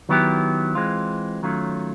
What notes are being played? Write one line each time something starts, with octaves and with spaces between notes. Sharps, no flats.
D#3 F#3 B3 E4 G4
E3 G#3 C4 F4
D#3 F#3 A3 C#4 F4